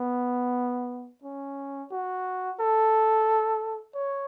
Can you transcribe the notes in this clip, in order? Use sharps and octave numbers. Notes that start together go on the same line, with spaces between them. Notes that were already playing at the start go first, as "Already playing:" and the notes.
Already playing: B3
C#4
F#4
A4
C#5